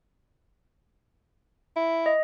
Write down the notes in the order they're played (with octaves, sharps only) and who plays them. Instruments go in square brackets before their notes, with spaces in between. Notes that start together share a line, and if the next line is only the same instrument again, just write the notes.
[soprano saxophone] E4
[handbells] D#5